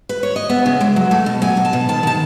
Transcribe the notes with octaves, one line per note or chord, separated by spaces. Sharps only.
B4
C#5
D#5
B3 E5
C#3
G#3
F#3
A3
B2
F#3 G#5
B2
A5
B2
D#3 A5
D#3 A5